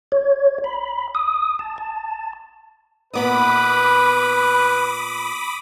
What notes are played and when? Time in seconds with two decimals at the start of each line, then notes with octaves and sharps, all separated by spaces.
0.12 C#5
0.64 B5
1.15 D#6
1.59 A5
1.78 A5
3.13 A#2 B3 D#4 B4 B5 D6 D#6